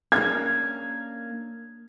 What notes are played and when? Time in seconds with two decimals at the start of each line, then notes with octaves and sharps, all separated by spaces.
0.12 A#3 C#4 D4 G#6